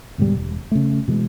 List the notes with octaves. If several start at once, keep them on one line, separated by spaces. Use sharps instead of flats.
D2 G#2 B2 G3
E1
C#3 A3
B2 E3 G#3